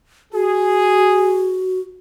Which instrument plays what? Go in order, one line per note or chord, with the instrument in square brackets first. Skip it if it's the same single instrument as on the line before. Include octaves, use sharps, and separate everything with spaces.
[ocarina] F#4 [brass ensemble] G#4